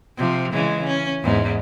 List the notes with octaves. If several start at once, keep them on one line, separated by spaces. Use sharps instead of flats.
C3 F3
C#3 E3 G#3
C#4
E2 G#2 B3